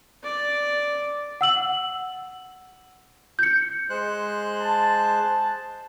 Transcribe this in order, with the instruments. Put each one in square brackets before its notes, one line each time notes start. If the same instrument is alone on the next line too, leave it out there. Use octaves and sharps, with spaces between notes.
[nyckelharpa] D5
[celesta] F#5 E6 F#7
G6 C#7
[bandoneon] G#3 C5 F#6
[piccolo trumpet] A5